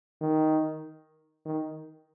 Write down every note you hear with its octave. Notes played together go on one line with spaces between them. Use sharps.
D#3
D#3